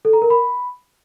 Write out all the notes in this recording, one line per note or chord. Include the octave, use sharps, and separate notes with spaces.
A4
A#5
A#4
B5